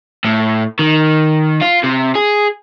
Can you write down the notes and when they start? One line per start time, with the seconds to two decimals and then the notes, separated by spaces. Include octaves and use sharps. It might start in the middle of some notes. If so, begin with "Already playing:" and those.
0.25 A2
0.79 D#3
1.61 F4
1.84 C3
2.15 G#4